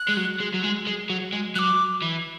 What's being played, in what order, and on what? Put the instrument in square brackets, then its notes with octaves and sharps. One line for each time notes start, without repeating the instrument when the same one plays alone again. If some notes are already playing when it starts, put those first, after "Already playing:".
Already playing: [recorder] F#6
[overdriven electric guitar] G#3
F#3
G#3
F#3
G#3
G#3
F#3
G#3
[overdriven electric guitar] F#3 [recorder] D6 F#6
[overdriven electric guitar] E3